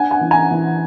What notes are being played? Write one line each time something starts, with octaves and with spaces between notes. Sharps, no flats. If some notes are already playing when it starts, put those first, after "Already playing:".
Already playing: D4 F#5 G#5
F#5 G#5
E3
G#5 A#5
E3